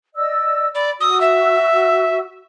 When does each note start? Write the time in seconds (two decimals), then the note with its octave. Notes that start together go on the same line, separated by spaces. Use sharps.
0.16 D5 D#5 E6
0.75 D5 B5
1.01 F#4 D#6 E6
1.21 E5